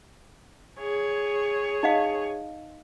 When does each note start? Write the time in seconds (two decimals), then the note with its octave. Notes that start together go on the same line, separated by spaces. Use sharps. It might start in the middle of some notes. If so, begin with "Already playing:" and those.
0.79 G#4 C#5
1.83 D#4 D#5 F5